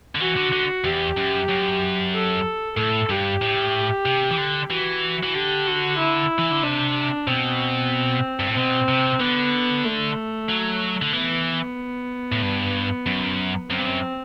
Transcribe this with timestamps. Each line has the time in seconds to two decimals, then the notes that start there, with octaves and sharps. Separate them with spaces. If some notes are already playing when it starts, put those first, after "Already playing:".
0.15 D3
0.20 E3 F#4
0.36 D3
0.52 D3
0.84 E2 G4
1.17 F#2
1.49 F#2
2.14 A4
2.77 A2 A4
3.09 G2 G4
3.41 A2
4.06 C3
4.31 E3
4.38 D3
4.70 E3 F#4
5.23 E3
5.34 D3 G4
5.67 F#4
5.98 E4
6.39 E3
6.51 D3
6.63 C3 D4
7.27 B2 C4
8.39 G2
8.47 A2
8.56 B2 C4
8.88 C3
9.20 D3 B3
9.85 A3
10.49 F#3
11.02 D3
11.13 E3 B3
12.32 A2
12.42 G2
13.06 F#2
13.71 F#2 C4
13.78 G2
13.86 F#2